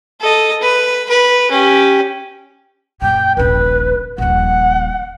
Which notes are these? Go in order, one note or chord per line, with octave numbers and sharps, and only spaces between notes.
A4 D#5
B4
B4
C#4 G4
F#2 A#2 G5
D#1 A#1 B4
D#1 A#1 F#5